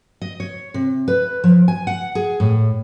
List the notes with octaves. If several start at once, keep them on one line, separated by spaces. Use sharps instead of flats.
D#5
C#5
C3
B4
F3
G#5
F#5
G#4
A2